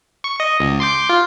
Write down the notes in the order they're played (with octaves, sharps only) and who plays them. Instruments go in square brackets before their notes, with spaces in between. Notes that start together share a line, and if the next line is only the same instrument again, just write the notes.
[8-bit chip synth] C#6
D#5
C#2
C6 D6 G6
F4